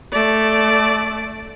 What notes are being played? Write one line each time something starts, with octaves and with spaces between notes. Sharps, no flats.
A3 D5